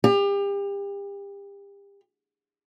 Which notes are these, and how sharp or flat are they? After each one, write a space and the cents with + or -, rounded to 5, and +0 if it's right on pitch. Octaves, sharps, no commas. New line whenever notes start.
G4 +35